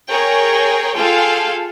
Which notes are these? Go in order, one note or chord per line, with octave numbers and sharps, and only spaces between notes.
G#4 A#4 C#5 G5
F4 G#4 A4 F5 G5